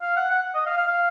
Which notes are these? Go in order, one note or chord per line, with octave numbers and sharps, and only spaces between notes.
F5
F#5
F#5
D#5
F5
F5
F5